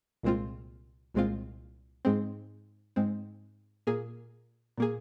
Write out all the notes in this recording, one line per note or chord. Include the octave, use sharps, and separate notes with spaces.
C2 A#2 G#3 C4 F4
C2 A#2 G#3 C4 F4
G#2 G#3 C4
G#2 G#3 C4
A#2 A#3 G#4
A#2 A#3 G#4